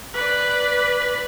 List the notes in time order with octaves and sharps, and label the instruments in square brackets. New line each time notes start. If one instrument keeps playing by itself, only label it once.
[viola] B4 D5